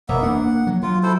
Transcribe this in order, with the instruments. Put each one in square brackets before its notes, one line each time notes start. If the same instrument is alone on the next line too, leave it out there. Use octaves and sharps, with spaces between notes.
[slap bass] E1 [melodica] A#3 B3 E5
[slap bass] A#3 D4 [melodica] F#5
[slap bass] F3 F#3
[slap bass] F#3 [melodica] F4
[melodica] E4 A4 C5